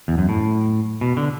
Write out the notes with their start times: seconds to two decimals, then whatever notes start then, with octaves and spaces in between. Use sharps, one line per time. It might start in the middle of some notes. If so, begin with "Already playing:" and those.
0.08 E2
0.18 F#2
0.29 A2
1.01 B2
1.17 D3